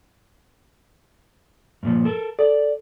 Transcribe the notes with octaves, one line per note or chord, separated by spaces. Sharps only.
G2 A#2 F3
A4 A#4
A4 D5